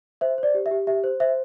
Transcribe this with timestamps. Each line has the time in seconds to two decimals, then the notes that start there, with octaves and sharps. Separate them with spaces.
0.21 C5 E5
0.38 C5
0.43 D5
0.54 G4
0.66 E5
0.71 G4
0.87 G4 E5
1.04 C5
1.20 C5 E5